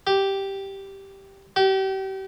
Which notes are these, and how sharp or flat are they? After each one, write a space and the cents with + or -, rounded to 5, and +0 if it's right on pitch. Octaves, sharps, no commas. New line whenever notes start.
G4 -5
G4 -35